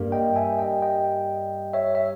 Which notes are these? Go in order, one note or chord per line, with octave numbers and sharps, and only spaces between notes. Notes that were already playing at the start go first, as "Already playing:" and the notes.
Already playing: G2 G3 A#3
D#5 G5
E5 G#5
D#5 G5
D#5 G5
C#5 E5
E5